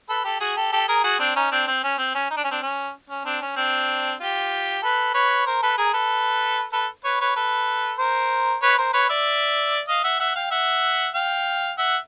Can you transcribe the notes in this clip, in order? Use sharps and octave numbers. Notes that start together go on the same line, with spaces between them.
A4 B4
G4 A4
F#4 G#4
G4 A4
G4 A4
G#4 A#4
F#4 G#4
C4 D4
C#4 D#4
C4 D4
C4
C#4
C4
C#4
D#4
D4
C#4
C4 D4
C#4
C#4
C4 D4
C#4
C4 D4
F4 G4
A4 B4
B4 C#5
A#4 C5
A4 B4
G#4 A#4
A4 B4
A4 B4
B4 C#5
B4 C#5
A4 B4
A#4 C5
B4 C#5
A#4 C5
B4 C#5
D5 E5
D#5 F5
E5 F#5
E5 F#5
F5 G5
E5 F#5
F5 G5
E5 F#5